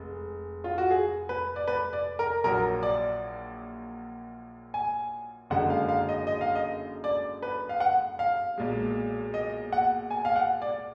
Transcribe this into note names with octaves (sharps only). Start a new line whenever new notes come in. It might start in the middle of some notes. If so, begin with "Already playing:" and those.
Already playing: F1 G#3
F4
F#4
G#4
B4
D5
B4
D5
A#4
A#1 A#2 F#3 A#4
D5
G#5
F#1 F#2 D3 G#3 F#5
F5
F5
D#5
D#5
F5
D#5
D5
B4
F5
F#5
F5
B1 A#2 G#3
D#5
F#5
G#5
F5
F#5
D5